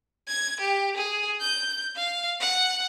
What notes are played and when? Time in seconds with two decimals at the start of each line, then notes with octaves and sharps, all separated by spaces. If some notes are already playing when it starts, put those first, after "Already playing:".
0.28 G#6
0.60 G4
0.96 G#4
1.41 G6
1.96 F5
2.40 F#5